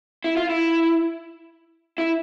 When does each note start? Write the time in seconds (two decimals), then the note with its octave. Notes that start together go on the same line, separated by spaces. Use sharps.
0.24 E4
0.37 F4
0.49 E4
1.98 E4